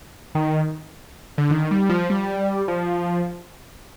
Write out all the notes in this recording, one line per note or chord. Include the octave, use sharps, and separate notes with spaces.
D#3
D3
D#3
G3
F3
G3
F3